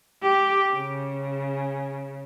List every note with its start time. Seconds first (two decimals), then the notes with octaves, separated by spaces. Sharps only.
0.23 G4
0.74 C#3